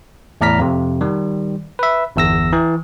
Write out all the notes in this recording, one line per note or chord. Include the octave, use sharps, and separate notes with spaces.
E2 A2 D5 A#5 F6 B6
F2 C3
D#3 G3
B4 E5
G1 E2 E6 A#6
E3